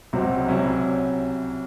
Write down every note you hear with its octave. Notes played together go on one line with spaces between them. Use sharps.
C#2 C3 F#3 C4 F#4
C2 C3 F#3 C#4 E4